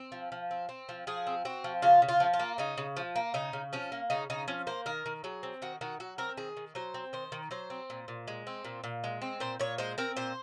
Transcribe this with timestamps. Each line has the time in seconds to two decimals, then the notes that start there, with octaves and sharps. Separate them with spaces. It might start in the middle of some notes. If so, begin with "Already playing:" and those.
Already playing: C4
0.12 F3
0.32 F3
0.51 C4
0.69 C4
0.89 F3
1.07 F3 G#4
1.27 C4
1.45 C4 F#4
1.64 F3
1.82 C#3 F4
2.02 C#3
2.09 F4
2.20 F3
2.34 F4
2.40 A#3
2.58 C#3 D#4
2.78 C#3
2.97 F3
3.16 A#3
3.34 C#3 D#4
3.53 C#3
3.73 F3 C#4
3.92 A#3
4.10 C#3 D#4
4.30 C#3 D#4
4.48 F3 C#4
4.67 A#3 C5
4.86 D#3 A#4
5.06 D#3
5.24 F#3 G#4
5.43 C4
5.62 D#3 F#4
5.81 D#3 F#4
6.00 F#3 F#4
6.18 C4 A#4
6.37 D#3 G#4
6.57 D#3
6.75 F#3 C5
6.94 C4
7.13 D#3 C5
7.32 D#3
7.51 F#3 C5
7.70 C4
7.90 A#2
8.08 A#2
8.28 G#3
8.47 C4
8.65 A#2
8.84 A#2
9.04 G#3
9.22 C4
9.40 A#2 C5
9.60 A#2 C#5
9.78 G#3 C5
9.98 C4 A#4
10.17 A#2 C5